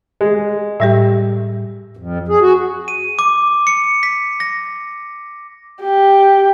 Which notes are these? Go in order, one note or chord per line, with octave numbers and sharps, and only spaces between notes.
G#3
A2 G3 G4 E5
F2
G#4
F#4
D#7
D6
C#7
B6
A#6
G4